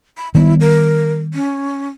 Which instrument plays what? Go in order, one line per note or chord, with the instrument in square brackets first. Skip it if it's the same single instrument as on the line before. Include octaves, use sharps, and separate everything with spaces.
[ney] B5
[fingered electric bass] D#3 G3 B3 [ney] E4
[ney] A#4
C#4